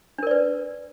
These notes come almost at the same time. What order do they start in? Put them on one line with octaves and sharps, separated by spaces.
D4 A#4 D5 B4